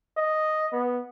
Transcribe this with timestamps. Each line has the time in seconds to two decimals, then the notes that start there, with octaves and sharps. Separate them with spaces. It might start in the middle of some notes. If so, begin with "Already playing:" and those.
0.17 D#5
0.73 B3